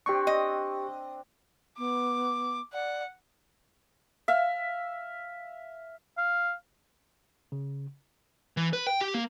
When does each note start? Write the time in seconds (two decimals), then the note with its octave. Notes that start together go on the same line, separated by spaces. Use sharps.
0.06 C4 D4 G4 C#6
0.27 D#5
1.78 B3 D6
2.73 D5 F#5
4.28 E5 F5
6.18 F5
7.52 C#3
8.57 E3
8.73 B4
8.87 G5
9.01 G4
9.14 A#3